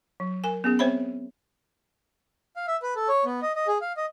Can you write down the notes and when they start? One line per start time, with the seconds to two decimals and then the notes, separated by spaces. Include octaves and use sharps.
0.20 F#3
0.44 A#4 G#5
0.64 B3 C#4 G#4
0.79 C4 C5 C#5 E5 B5
2.56 F5
2.68 E5
2.83 B4
2.96 A4
3.09 C#5
3.25 B3
3.42 D#5
3.56 D#5
3.67 G#4
3.81 F5
3.97 D#5